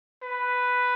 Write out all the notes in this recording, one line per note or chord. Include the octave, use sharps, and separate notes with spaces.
B4